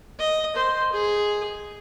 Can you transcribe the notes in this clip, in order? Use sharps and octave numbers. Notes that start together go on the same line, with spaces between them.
D#5
C5
G#4